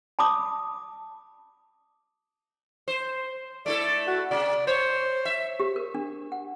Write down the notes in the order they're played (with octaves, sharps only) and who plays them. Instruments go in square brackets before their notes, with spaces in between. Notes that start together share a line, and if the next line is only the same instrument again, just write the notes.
[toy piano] A5 B5 D6 D#6
[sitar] C5
[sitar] A3 E4 A4 [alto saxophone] D5
[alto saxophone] F#4
[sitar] C3 [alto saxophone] D5
[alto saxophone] C5 [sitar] C#5
[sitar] E5
[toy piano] G4
A#4
D4
F#5